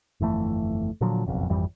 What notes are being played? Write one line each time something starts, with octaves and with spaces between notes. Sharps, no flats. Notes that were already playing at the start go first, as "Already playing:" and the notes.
G1 F2 E3 A3
A#2 D3 F3 F#3
F#1 B1 F2
G#1 F2 E3 G3